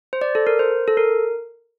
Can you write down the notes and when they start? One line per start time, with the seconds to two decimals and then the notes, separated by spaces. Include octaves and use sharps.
0.13 C5
0.21 D5
0.35 A4
0.47 A#4
0.59 C5
0.88 A4
0.97 A#4